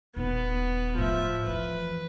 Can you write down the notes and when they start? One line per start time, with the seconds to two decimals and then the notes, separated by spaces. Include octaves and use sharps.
0.16 D#1 A#2 B3
0.98 A2 F3 E5
1.46 F2 E3 B4